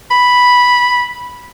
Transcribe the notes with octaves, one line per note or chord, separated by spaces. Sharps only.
B5